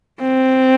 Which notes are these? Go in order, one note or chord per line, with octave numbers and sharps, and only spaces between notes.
C4